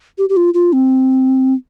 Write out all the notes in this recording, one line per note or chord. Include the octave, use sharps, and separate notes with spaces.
G4
G4
F4
F4
C4